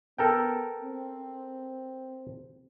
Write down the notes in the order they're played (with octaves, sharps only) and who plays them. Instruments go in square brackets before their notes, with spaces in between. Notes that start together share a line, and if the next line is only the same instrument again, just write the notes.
[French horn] B3 [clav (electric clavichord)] A4 A#4 G5
[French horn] C4